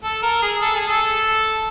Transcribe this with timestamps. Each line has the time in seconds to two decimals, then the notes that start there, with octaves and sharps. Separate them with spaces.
0.04 A4
0.23 A#4
0.42 G#4
0.62 A4
0.75 G#4
0.89 A4